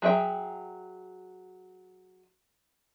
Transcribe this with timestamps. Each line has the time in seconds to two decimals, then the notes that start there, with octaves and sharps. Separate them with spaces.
0.02 F#3 G#4 E5 G5